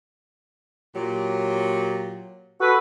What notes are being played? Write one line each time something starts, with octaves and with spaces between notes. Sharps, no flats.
A#2 F#3 G4
F#4 A4 B4